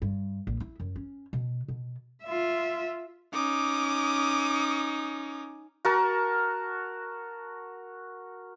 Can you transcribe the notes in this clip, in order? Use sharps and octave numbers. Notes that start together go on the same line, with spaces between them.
G2
A#1
E4
F#2
C#4
B2
B2
F4 E5
C#4 D#4 D6 D#6
F#4 A#4 A5